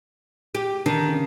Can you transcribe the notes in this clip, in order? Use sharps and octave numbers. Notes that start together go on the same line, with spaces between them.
G4
D3 D#3 A5 C7
C#3